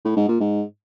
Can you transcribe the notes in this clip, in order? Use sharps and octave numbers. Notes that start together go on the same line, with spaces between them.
A2
G#2
A#2
G#2